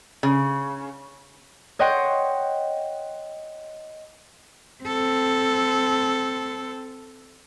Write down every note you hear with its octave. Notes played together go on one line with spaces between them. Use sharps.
C#3
C#5 D#5 F#5 G5 C6
C4 A4